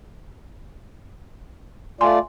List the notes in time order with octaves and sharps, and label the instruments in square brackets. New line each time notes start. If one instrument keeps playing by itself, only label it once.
[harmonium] A3 F4 D5 [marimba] G#5 C6